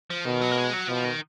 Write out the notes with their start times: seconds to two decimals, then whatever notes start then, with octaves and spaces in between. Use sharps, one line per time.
0.10 F3
0.25 B2 D#3
0.41 F#3
0.51 A#3
0.58 G#3
0.73 F#3
0.88 B2 F3
1.05 D#3